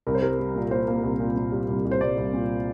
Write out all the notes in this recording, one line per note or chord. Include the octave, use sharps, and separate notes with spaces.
C2 A#4
C5
G3 A#4
G3
A#2
A#3 C5
A#3
C2
A#2
A#2
G3
C2
C2
C5
C2 D5
C2
A#2